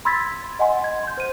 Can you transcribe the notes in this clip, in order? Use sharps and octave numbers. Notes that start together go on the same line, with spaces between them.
B5 C6 E6 G#6 A6 B6
D#5 F#5 G#5 C6
G#6
C6 G6
C5 D#7